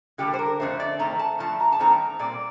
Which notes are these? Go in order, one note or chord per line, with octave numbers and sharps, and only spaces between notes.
D3 G3 A#3 G4
C5
A#4
F2 D3 A3 C5
D5
F2 D#3 A3 C4 A#5
A5
G2 F3 A3 A5
A#5
A5
G2 D#3 A3 C4 A#5
A#2 G3 C4 D5